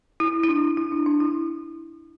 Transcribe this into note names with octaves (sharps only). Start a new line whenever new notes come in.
E4
E4
D4
E4
D4
D4
E4